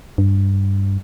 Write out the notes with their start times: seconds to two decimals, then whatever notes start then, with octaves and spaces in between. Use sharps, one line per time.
0.18 G2